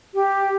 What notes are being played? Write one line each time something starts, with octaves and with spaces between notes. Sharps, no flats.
G4